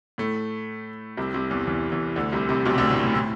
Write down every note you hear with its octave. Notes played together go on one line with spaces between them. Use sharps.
A2 A3
C2 C3
C2 C3
E2 E3
E2 E3
E2 E3
D2 D3
C2 C3
C2 C3
B1 B2
C3
D2 D3
A2
A2
A2